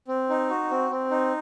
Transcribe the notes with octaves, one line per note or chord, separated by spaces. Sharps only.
C4
D#4
F#4
C4
C4
D#4